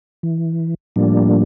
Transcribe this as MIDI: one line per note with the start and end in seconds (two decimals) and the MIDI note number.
0.23 0.74 52
0.96 1.43 45
0.96 1.43 53
0.96 1.43 55
0.96 1.43 58
0.96 1.43 62